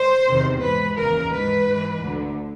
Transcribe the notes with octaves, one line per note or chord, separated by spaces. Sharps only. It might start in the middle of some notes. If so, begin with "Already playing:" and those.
Already playing: C5
E2 C3 D#3
G#2 E3 B4
D#2 C#3 E3 A#4
G#2 E3 B4
G#2 E3
D2 D3